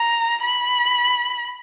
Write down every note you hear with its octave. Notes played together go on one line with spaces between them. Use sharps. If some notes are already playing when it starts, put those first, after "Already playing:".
Already playing: A#5
B5